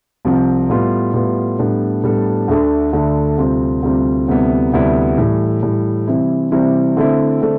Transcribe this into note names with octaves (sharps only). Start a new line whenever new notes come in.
C2 C3 F3 C4
A2 G3 B3 F4 B4
A2 G3 B3 F4 B4
A2 G3 B3 D4 A4
A2 G3 B3 D4 A4
D2 D3 A3 D4
D2 D3 A3 D4
D2 C3 G3 C4 F4
D2 C3 G3 C4 F4
D2 C3 G3 B3 E4
D2 C3 G3 B3 E4
A2 E3 G3
A2 E3 G3
C3 E3 G3 C4 E4
C3 E3 G3 C4 E4
D3 A3 C4 E4
D3 A3 C4